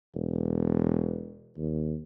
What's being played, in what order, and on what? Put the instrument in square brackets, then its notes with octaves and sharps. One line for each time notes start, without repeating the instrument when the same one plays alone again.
[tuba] E1
D#2